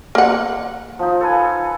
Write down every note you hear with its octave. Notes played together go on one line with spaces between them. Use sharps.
A#3 F#5
F3 D#4
A4 B4 G#5